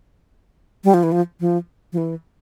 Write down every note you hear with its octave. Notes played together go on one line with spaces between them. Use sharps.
G3
F3
E3
F3
F3
F3
E3